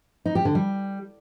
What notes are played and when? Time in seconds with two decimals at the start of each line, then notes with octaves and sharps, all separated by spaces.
0.26 D#4
0.35 G4
0.45 D3
0.55 G3